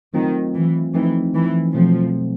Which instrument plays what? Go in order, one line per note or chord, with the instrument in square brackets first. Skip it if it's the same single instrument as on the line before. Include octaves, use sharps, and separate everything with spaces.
[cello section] D#3 [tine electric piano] F#3 A3 C4 F4
[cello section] E3
[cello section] E3 [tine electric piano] F3 A3 C4 D#4
[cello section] E3
[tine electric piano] B2 F#3 A3 C4 [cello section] F3